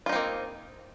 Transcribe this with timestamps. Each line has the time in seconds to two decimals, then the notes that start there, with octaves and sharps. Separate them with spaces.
0.06 F4
0.09 D#4
0.12 C4
0.16 A#3